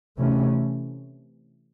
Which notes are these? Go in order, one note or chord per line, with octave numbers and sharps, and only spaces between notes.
C3 E3 A3 C#4